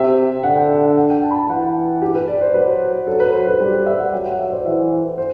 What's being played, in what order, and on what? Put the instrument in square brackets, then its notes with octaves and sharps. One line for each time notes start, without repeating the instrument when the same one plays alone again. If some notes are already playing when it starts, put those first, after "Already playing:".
Already playing: [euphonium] C3 [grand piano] E5
[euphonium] D3 [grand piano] F#5
[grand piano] G5
F#5
F#5
G5
A5
B5
A5
[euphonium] E3 [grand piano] F#5
[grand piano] G4
B4
D5
C5
[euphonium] F#3 [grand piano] B4
[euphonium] F#3 [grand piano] A4
[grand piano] B4
C5
B4
[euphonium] G3 [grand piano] G4
[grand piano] D5
E5
F#5
[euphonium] F#3 [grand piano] G5
[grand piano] F#5
E5
D5
C5
[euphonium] E3 [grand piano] E5
[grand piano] C5